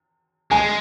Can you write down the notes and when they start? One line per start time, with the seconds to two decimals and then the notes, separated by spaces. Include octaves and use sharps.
0.51 G#3 G#5